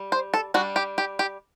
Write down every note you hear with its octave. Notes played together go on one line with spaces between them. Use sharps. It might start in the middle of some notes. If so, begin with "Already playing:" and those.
Already playing: G3
C5
A4
G3 D4 F#4
G4
G4
G4